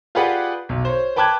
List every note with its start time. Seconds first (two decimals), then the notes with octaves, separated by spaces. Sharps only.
0.15 F4 G4 G#4 B4 D5 F#5
0.69 B1
0.85 C5 C#5
1.16 B4 G5 A5 D6 F#6 G#6